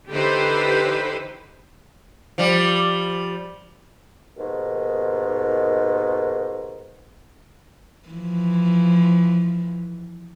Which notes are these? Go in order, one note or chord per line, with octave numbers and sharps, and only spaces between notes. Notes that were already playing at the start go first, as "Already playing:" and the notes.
D3 E3 D#4 G4 B4 C5
F3 G3
D#2 G#2 B2 D#3
E3 F3